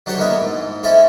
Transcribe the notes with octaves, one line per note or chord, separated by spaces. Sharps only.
F#3 D4 F#4 G4 C5 C#5
G#3 A#3 B3 E4 D#5 E5
G#2
G#3 C4 C#4 E4 A4 E5